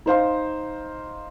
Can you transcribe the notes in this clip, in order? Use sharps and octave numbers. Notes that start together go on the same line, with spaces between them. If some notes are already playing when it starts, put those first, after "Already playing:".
D#4 C5 F5 C6